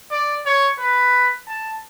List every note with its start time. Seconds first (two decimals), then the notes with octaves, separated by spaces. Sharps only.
0.11 D5
0.46 C#5
0.80 B4
1.48 A5